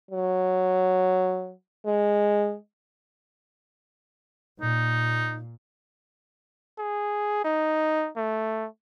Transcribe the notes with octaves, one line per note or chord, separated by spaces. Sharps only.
F#3
G#3
A#2 D#4
G#4
D#4
A3